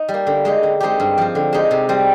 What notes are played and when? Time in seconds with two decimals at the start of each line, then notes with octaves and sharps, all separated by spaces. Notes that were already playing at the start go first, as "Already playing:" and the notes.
Already playing: D#4
0.09 G3
0.14 A#3
0.27 D3
0.45 G#3 D#4 G4
0.63 D3
0.80 G#3 C4 D#4 G4
1.00 G2
1.18 F3 C4
1.35 D3
1.53 G#3 D#4 G4
1.71 C3
1.89 G3 C4